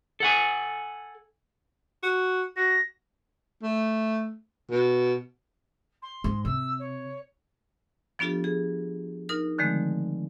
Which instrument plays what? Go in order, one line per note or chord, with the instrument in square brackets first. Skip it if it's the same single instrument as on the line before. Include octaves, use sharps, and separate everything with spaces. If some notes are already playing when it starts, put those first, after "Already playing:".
[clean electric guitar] A4 F#5 G#5
[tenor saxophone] F#4
[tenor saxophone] F#4 [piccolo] A#6
[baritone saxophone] A3
B2
[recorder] C6
[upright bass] G#2
[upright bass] C3 [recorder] E6
[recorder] C#5
[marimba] F3 B3 D4 F4 G4 A4
G#4
D#4 A#4 F6
D3 D#3 F3 G#3 A3 C4